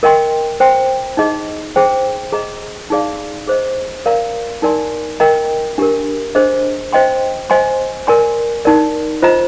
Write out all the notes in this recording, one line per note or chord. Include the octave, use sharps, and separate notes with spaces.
A#4 D#5 G5 C6
C5 G5 C6
D#4 G#4 D#5
G#4 C5 G5
G#4 D#5 A#5
D#4 G#4 D5 F5
G#4 C5 D#5
A#4 D5 F5 A#5
D#4 A#4 D5 G#5 C6
A#4 D#5 G5 A#5
D4 G4 A#4
D4 G#4 C5 D#5
C5 D#5 G5 C6
C5 D#5 G#5 C6
A#4 D5 G#5 C6
D#4 A#4 D5
F4 C5 D#5 A#5